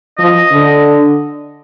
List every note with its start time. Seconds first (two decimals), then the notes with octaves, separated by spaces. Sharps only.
0.19 F3 D#5
0.52 D3